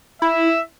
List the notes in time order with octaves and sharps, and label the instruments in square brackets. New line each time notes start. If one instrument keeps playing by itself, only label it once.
[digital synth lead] E4 [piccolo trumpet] E5